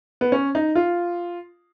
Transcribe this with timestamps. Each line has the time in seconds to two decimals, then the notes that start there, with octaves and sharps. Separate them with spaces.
0.21 B3
0.32 C#4
0.55 D#4
0.75 F4